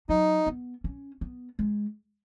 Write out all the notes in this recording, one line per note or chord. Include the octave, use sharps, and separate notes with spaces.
F#3 D#4
B3
C#4
B3
G#3